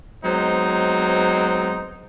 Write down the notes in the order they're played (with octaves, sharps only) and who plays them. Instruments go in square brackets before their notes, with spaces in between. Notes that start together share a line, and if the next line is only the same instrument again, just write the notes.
[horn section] F#3 G#3 B3 C4 D#4 C5